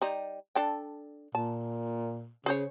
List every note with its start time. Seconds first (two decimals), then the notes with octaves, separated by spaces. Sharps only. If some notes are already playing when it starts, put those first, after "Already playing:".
0.02 G3 D#4
0.55 D4 A4 G5
1.35 A#2 A5
2.46 C#3 G#4 C5 C#5